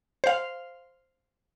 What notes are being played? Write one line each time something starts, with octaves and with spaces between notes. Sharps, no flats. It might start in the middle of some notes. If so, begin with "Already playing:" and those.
C5 F5